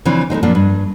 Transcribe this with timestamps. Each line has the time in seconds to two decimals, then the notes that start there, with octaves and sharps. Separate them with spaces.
0.05 C#3 E3 F3 C4 D4
0.30 G#3 A3 C4 D#4
0.43 F#2 A#2 F3 A#3 D4
0.55 G2